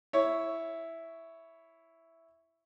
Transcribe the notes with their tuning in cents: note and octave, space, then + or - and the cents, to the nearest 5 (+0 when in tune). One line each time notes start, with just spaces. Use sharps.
E4 +0 C#5 +5